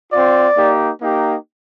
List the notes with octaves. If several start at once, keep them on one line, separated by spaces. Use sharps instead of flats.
C4 F4 D5
A#3 D#4 G4
A#3 D#4 G4